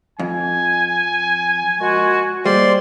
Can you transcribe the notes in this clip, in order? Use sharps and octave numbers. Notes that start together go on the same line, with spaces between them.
F2 G#5
A#2 G#3 F#4
G3 G#3 A#3 C5 D5 C6